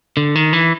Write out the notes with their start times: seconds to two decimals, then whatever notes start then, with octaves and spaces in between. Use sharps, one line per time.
0.17 D3
0.36 D#3
0.53 E3